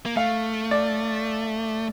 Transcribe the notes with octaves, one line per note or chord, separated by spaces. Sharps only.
A#3
A3 F5
D5